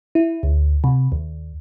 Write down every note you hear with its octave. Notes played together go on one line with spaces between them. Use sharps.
E4
D2
C3
D#2